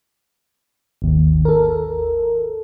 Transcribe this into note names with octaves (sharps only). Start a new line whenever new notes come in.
G#1 D#2
A4 A#4